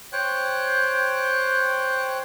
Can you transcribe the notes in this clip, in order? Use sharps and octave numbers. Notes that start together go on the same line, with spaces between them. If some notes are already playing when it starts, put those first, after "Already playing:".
C5 C#5 G5 F#6